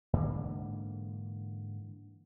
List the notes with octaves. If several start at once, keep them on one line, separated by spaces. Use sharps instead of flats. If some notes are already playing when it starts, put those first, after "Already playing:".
G#2 D3 E3 A#3